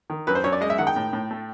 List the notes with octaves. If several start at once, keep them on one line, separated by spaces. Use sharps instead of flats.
D#3
F#2 B4
C5
F#2 C#5
D5
G#3 D#5
E5
D#3 F#5
G5
A2
A2
A3